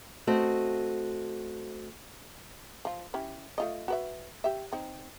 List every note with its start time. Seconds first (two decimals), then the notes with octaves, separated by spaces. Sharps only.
0.27 A3 C4 F#4 D#5
2.85 F3 F4
3.14 C#4 E4 G4
3.58 A3 F4 D#5
3.88 F#4 B4 E5
4.44 G4 E5
4.73 C4 D#4